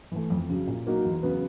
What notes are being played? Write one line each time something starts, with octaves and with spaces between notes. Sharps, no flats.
E3 A3
F2
C#3 F#3
A#2
F#3 A#3 D#4 F#4
E2
C#3 F#3 B3